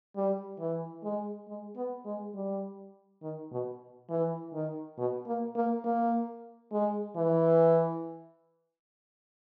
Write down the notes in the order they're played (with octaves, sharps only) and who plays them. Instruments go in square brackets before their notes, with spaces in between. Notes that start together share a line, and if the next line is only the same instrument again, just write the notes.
[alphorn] G3
E3
G#3
G#3
B3
G#3
G3
D#3
B2
E3
D#3
B2
A#3
A#3
A#3
G#3
E3